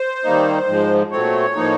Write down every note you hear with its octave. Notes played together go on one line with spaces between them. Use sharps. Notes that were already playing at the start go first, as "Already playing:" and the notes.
Already playing: C5
D#3 G3 A#3 D#4
G#2 F3 G#3
A#2 F#3 A3 C4 C#5
A2 F3 A#3 D#4